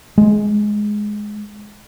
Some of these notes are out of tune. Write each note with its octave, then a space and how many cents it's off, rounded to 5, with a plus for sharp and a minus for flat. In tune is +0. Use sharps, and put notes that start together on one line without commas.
G#3 +10